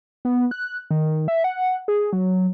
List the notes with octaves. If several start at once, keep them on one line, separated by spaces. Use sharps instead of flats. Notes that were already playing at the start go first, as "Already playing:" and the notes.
B3
F#6
D#3
E5
F#5
G#4
F#3